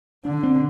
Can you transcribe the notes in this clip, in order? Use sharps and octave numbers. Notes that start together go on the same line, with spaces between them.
D3 D4
C4